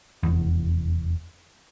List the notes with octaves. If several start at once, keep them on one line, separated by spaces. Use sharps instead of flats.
F1 E2